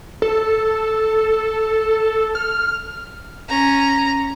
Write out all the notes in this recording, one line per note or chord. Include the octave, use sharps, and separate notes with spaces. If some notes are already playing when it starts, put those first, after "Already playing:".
A4
F6
C#4 A#5